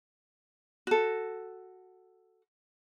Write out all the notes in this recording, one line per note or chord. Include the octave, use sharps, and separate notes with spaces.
F#4 A4